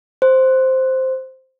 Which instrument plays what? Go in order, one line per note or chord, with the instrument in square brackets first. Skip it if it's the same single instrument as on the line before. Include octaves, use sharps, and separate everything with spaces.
[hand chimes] C5